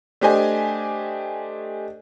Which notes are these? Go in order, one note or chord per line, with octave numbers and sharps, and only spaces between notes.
A3 D4 G4 C5 D#5 G#5